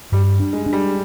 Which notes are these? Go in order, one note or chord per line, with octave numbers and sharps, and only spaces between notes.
G2 G3
D4
G#3
D4
G3